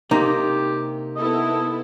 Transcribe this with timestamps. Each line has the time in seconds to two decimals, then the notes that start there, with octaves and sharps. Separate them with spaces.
0.11 C3 A#3 D#4 G4
1.16 B3 E4 A4 D#5